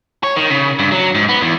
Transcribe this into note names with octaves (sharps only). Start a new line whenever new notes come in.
C#5
D#3
C#3
G2
F#3
G#2
B3
E2